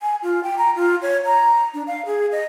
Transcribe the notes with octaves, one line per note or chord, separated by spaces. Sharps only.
G#5
F4
G5
A#5
F4
C#5
A#5
D4
F5
G#4
D#5